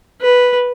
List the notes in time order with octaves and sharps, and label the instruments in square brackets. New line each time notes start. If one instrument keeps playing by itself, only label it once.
[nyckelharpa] B4